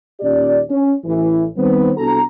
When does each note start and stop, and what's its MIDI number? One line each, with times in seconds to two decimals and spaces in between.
0.20 0.61 39
0.20 0.61 46
0.20 0.61 61
0.20 0.61 67
0.20 0.61 74
0.70 0.92 61
1.05 1.44 33
1.05 1.44 52
1.57 1.90 51
1.57 1.90 55
1.57 1.90 59
1.57 1.90 60
1.97 2.20 36
1.97 2.20 59
1.97 2.20 62
1.97 2.20 66
1.97 2.20 69
1.97 2.20 82